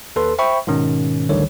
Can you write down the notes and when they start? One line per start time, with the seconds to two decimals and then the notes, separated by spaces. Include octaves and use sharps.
0.16 D#2 A4 B4 C6
0.39 C5 E5 G5 B5 C#6
0.67 G#2 B2 D#3 C#4
1.29 A1 D2 D3 D#3 G3 C#5